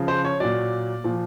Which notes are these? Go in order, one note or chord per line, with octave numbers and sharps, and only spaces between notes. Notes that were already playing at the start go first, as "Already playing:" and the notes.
Already playing: C#3 F3
C5
C#5
A#2 F#3 D5
A#2 F3